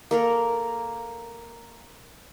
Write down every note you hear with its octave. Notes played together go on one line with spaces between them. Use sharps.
A#3 A4 A#4